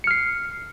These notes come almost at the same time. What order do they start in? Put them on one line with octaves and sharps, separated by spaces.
C#7 F6 C7